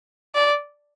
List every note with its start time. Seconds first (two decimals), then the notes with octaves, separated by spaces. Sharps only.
0.35 D5